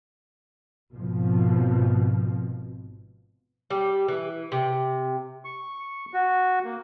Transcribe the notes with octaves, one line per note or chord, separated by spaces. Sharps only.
G#1 B2 F3
G3
E3
C3
C#6
F#4
A#3